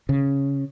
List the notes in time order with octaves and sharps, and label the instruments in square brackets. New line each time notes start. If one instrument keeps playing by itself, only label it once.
[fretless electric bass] C#3